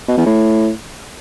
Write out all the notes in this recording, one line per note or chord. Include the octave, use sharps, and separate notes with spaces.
B2
E2
A2